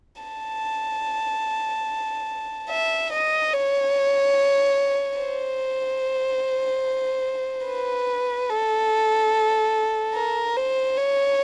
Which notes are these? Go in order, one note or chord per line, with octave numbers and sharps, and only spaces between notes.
A5
E5
D#5
C#5
C5
B4
A4
A#4
C5
C#5